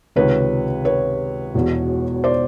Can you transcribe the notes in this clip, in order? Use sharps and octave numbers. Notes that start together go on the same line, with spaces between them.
C#2 C3 D#3 B4 C#5
B4 C#5
E1 E2 B2
C5 D5